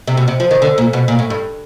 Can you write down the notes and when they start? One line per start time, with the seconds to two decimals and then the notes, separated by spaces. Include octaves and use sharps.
0.07 C3
0.17 B2
0.28 C3
0.40 F3
0.51 D#3
0.62 D3
0.78 A#2
0.93 B2
1.08 A#2
1.19 A2
1.30 G2